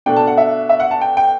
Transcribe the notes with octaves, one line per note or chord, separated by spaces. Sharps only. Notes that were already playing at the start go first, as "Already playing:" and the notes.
B2 A3 D4 G5
A5
F#5
E5
E5
F#5
A5
G5
G5